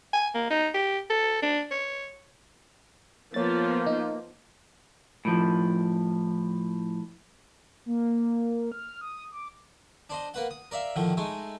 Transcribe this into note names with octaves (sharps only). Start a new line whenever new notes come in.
G#5
A#3
D#4
G4
A4
D4
C#5
F3 A#3 B3 F4 C#5 A6
D#4
A2 F3
A#3
F6
D#6
D6
D4 C5 D#5
A#3 B4 F#5
D#6
A#4 D5 E5 F5
A2 D3 D#3 F3
G#3 A3 D#4